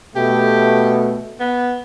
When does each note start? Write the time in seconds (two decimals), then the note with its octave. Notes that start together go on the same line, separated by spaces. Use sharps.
0.16 B2 A3 G4
1.40 B3